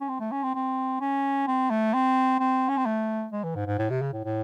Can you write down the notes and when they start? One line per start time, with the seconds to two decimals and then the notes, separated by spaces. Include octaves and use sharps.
0.01 C#4
0.09 C4
0.20 A3
0.32 C#4
0.43 C4
0.55 C4
1.01 C#4
1.47 C4
1.70 A3
1.94 C4
2.40 C4
2.69 C#4
2.77 C4
2.86 A3
3.32 G#3
3.44 E3
3.55 G#2
3.66 G#2
3.78 A2
3.90 C3
4.01 C#3
4.13 A2
4.25 A2